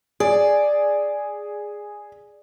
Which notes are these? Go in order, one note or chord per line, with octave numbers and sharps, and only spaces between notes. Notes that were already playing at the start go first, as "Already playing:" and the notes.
G#4 D5